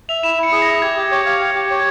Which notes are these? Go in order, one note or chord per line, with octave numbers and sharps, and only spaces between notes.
E5 F7
E4 E7
E4
C#7
G#4
A#6
E5
G4 G#6
G4
C#5
F5
G4
G4
C#5